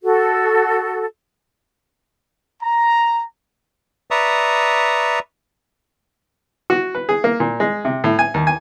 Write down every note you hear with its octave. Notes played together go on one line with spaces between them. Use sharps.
F#4 A4
A#5
B4 D5 E5 A#5 C#6 D#6
F#4
B4
G#4
A#3
A#2
G#3
C3
A2
G#5
D#2
G#5